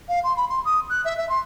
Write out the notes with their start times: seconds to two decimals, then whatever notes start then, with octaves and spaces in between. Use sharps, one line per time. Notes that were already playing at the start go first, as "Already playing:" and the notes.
0.08 F5
0.24 C6
0.37 B5
0.49 C6
0.65 D#6
0.90 F#6
1.05 E5
1.17 E5
1.29 C6